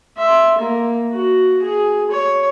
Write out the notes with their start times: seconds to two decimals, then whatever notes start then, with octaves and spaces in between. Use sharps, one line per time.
0.17 E5 C6
0.58 A#3
1.12 F#4
1.62 G#4
2.11 C#5